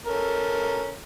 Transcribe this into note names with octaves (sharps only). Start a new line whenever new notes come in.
C#4 A4 A#4